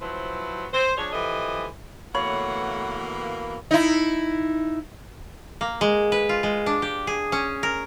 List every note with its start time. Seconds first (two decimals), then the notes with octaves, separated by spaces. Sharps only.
0.02 F3 F#3 E4 B4 C5
0.74 C5
0.98 F3 D4 G#4 C#5
1.13 E3 F3 G4 A4 D#5
2.15 B2 E3 A3 A#3 C#5 F#5 B5
3.71 D#4 E4
5.61 A#3
5.81 G#3
6.12 B4
6.29 F4
6.43 G#3
6.66 D4
6.82 G4
7.07 G#4
7.32 C#4
7.63 A#4